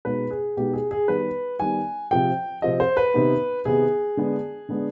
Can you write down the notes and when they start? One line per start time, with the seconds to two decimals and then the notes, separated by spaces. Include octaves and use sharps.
0.05 B2 G#3 B3 D#4 B4
0.30 G#4
0.57 B2 G#3 B3 D#4 G4
0.73 G#4
0.91 G#4
1.08 D#3 G3 B3 B4
1.60 D#3 G3 B3 G#5
2.11 C3 F3 C4 G5
2.62 C3 F3 C4 D#5
2.80 C5
2.97 B4
3.14 C3 D#3 B3 D#4
3.65 C3 D#3 B3 D#4 G#4
4.17 D3 G#3 B3 D4
4.69 D3 G#3 B3 D4